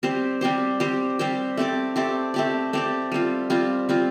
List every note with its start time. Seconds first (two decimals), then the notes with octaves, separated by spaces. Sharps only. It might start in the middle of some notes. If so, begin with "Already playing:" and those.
0.03 G3 C4 G4 C5
0.41 G3 C4 G4 C5
0.80 G3 C4 G4 C5
1.19 G3 C4 G4 C5
1.57 A3 C4 G4 D5
1.96 A3 C4 G4 D5
2.34 A3 C4 G4 D5
2.73 A3 C4 G4 D5
3.12 G3 C4 F4
3.50 G3 C4 F4
3.89 G3 C4 F4